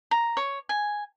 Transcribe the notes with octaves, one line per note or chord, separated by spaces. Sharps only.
A#5
C#5
G#5